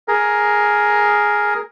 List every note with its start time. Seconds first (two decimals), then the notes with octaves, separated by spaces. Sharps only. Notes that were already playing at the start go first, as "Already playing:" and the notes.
0.08 G#4 A#4